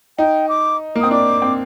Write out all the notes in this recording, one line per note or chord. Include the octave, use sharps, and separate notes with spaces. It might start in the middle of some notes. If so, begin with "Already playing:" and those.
D#4 G5
D6
A#3
C4 D#6
D4 D6
C4